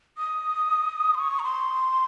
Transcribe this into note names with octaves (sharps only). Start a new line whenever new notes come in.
D#6
C6
C#6
A#5
C6